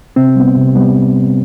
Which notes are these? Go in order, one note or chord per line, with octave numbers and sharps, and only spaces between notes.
C3 C4
G3 B3
C3
G3 B3